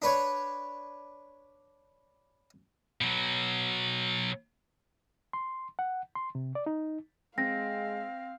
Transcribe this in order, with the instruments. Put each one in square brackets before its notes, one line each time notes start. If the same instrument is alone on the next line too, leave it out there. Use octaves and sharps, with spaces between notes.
[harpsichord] D4 B4 C#5
[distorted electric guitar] B2 F#3
[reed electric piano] C6
F#5
C6
C3
D5
D#4
[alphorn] G#3 [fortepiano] C4 [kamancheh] F5 [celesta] A#6